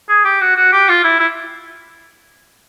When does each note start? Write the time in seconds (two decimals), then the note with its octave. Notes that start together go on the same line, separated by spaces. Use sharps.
0.09 G#4
0.24 G4
0.41 F#4
0.56 F#4
0.72 G4
0.88 F4
1.04 E4
1.19 E4